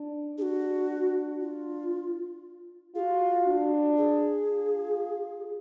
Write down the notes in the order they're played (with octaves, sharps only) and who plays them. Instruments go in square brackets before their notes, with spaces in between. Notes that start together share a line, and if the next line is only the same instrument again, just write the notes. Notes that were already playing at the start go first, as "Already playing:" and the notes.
Already playing: [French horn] D4
[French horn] D4 [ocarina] F#4 G#4
[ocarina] F4
[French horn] F4 [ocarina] G#4
[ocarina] F#4
[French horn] D4
[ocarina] G#4
[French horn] F4